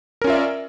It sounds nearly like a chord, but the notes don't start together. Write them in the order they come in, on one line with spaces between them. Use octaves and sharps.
A#4 C#4 F4 E5 D5